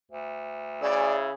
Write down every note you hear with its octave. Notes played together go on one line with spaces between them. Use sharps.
D2
C#3 E4 G#4 D5